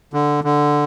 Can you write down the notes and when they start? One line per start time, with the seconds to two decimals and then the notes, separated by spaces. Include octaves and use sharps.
0.14 D3
0.44 D3